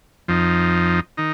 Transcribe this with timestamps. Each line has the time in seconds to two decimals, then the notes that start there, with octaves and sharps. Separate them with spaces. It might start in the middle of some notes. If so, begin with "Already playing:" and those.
0.28 F2 F3 D#4
1.17 D#3 D#4